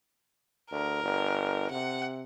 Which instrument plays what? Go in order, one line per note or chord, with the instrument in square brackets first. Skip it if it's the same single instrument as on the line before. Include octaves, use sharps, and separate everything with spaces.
[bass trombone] D2 [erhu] A#4
[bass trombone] G1
[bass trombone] C3 [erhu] F#5